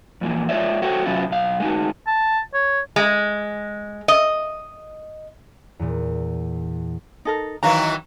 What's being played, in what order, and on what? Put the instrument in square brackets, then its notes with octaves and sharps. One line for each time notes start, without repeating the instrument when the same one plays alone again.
[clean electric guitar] F2 A#2 E3
G#3 F4 C#5 D5 E5
F#4 A4 C5 C#5 F#5 G5
C3 F#3 B3 C#4 E4 F4
B1 F5
G#3 D#4 F#4
[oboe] A5
C#5
[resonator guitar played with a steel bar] G#3
D#5
[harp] E2 A#2
[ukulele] D#4 A4 A#4
[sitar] D#3 E3 F#3 [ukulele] F5 A#5